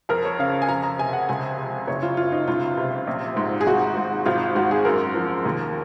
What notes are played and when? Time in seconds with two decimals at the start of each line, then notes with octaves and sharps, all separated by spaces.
0.09 F2 A#4
0.25 C#5
0.39 C#3 F5
0.62 G#5
0.68 F2 A#5
0.83 A#5
0.99 C3 G#5
1.13 F#5
1.29 C#2 G#5
1.58 C3
1.87 F#1 C#5
2.03 F4
2.17 F#2 F4
2.32 D#4
2.48 C#2 F4
2.77 C3
3.07 A#1
3.37 G#2
3.61 G#4
3.67 G#1 F#4
3.97 G#2
4.26 G#1 F4
4.55 G#2 F#4
4.71 G#4
4.85 F#2 A#4
5.15 F3
5.46 D#2